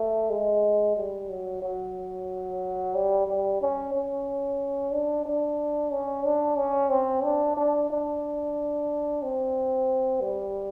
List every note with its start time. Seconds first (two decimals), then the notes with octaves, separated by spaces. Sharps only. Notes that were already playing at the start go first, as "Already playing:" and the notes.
Already playing: A3
0.30 G#3
0.96 G3
1.30 F#3
1.62 F#3
2.95 G3
3.27 G3
3.61 C#4
3.94 C#4
4.93 D4
5.26 D4
5.92 C#4
6.25 D4
6.57 C#4
6.90 C4
7.24 D4
7.57 D4
7.90 D4
9.22 C4
10.21 G3